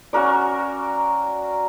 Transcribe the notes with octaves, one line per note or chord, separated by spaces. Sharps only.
C#4 F#4 A#4 D5